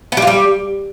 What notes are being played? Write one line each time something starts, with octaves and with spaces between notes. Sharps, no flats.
B3
G3
F4
G3